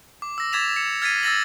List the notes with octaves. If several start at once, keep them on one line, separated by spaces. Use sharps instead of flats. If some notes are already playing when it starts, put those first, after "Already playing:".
D6
E6 A#6
D6 G#6 A6 B6 E7 F7
C#7
F6 G#6 A6 B6 C7 D#7
E6 A6 A#6 F#7